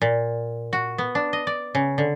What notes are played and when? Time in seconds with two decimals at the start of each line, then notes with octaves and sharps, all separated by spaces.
0.02 A#2
0.73 F#4
0.98 B3
1.15 D4
1.33 D#5
1.47 D5
1.75 C#3
1.98 D3